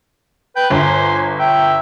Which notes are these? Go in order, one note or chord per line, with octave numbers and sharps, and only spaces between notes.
B4 G5
G1 C5 G#5
E5 G5